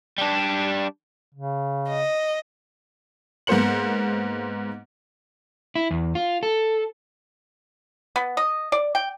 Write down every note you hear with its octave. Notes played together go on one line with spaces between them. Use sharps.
G3 D4
C#3
D#5
G#2 A#3 B3 C5 C#7 F#7
E4
E2
F4
A4
B3
D#5
D5
G5